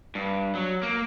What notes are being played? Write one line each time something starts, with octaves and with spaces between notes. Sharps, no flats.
G2
F#3
A#3